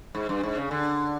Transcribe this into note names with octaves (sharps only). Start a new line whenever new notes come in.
G#2
G2
G#2
C#3
D3